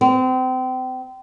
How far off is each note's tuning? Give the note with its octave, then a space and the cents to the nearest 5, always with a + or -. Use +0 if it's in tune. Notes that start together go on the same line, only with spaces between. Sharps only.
C4 -30